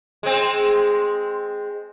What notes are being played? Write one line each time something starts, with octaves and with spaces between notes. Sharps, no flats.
G#3 C4